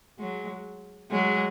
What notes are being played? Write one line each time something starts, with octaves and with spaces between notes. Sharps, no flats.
F#3 G#3
F#3 G#3